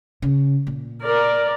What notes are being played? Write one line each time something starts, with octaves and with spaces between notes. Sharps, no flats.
C#3
A#2
A#4 D5